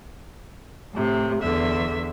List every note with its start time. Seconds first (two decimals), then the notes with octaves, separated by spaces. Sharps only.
0.93 A2 C3
1.42 E2 D3 E5